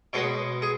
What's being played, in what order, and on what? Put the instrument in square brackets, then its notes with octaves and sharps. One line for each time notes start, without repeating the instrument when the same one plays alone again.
[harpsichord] B2 G#3 B3 C#5
G#4